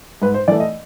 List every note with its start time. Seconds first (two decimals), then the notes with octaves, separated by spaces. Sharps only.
0.22 G#2 B4
0.34 C5
0.48 E3 A3 D5
0.60 D#5